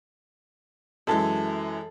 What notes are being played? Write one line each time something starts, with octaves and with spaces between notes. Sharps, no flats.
F#2 E3 G#3 A4 A5